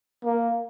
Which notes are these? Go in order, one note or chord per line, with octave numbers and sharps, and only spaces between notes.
A#3